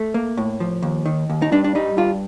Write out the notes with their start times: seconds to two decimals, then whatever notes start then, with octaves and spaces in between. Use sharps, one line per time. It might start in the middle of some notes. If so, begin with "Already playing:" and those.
Already playing: A3
0.14 A#3
0.37 A2
0.60 F3
0.83 D#2
1.06 D#3
1.29 D#2
1.42 D#4
1.52 G2 D4
1.64 D4
1.75 G3 D#4
1.97 G2 F4